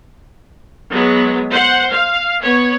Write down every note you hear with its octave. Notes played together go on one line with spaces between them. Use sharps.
F#3 G#3 B3
C5 F#5
F5
B3 C#5